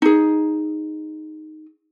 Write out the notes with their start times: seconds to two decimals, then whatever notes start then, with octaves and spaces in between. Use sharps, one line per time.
0.02 D#4 G#4